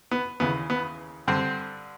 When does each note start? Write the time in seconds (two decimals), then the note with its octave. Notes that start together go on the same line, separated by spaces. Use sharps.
0.11 B3
0.40 D#2 C#3 E3 B3
0.70 B3
1.28 G2 D3 C4